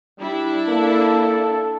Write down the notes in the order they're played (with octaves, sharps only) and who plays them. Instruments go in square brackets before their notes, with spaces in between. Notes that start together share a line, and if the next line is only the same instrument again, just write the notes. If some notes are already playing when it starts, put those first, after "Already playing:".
[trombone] G3 [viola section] D4 E4
[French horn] A#3 [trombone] A4